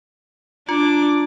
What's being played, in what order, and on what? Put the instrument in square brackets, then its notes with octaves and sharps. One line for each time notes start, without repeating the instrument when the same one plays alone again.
[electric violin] D4 D6 [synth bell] F4